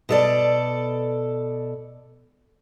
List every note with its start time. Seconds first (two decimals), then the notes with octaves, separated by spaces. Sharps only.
0.09 B2 A4 D5